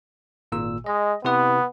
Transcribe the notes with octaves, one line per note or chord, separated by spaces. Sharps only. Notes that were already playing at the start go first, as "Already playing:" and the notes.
G#1 A#2 E6
G#3 D#5
C3 B3 E4 B4